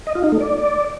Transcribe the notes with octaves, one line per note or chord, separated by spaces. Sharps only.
D#5
F4
D#4
A3
D5